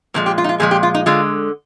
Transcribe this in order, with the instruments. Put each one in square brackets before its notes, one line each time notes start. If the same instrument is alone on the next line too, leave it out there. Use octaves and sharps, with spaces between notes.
[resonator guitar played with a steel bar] A#2 F3 G#3 A#3
G4
F4
D#4
F4
A#2 F3 G#3 G#4
G4
F4
D#4
D3 G#3 F4